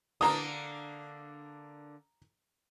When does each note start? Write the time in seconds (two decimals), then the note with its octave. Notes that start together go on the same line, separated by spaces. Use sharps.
0.21 D3 A#3 D4 A#5 D#6